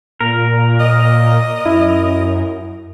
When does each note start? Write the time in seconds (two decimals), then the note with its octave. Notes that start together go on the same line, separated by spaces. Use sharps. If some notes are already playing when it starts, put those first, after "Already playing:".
0.21 A#2 A#4
0.80 A#2 D#5
1.66 F#2 E4